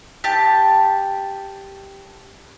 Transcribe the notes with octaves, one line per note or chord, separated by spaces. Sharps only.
G4 A5